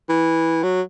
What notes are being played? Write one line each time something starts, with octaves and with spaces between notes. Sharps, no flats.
E3
F#3